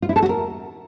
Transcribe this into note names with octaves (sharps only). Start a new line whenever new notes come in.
F4
E4
A4
F#4
A#4